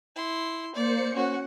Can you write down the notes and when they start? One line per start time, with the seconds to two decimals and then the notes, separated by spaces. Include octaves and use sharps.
0.16 E4 C6
0.75 A#3 C5 D5 C#7
1.14 C#4 F#4 F#5